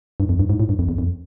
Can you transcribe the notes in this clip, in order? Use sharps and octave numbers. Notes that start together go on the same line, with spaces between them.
G2
F2
G2
G#2
A2
G2
F2
E2
F2